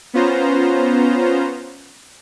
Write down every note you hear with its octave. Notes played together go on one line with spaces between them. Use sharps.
B3 C#4 F4 C5 A#5